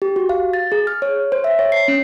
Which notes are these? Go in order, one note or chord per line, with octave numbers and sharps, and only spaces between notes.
G4
F#4
F5
A6
G#4
F6
C#5
C5
E5
C#5
C7
C#4